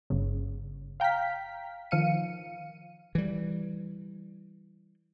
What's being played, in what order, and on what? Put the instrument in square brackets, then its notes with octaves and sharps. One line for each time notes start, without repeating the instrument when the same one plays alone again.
[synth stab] G1 C#3
F5 G5 A#5 F6 B6
D#3 F3 F5 C#7 D#7
[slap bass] E3 G3